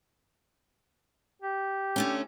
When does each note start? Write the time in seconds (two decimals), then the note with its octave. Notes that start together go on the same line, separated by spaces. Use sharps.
1.42 G4
1.96 D3 A3 C#4